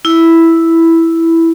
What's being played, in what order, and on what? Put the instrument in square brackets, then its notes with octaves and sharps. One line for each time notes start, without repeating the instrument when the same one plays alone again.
[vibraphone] E4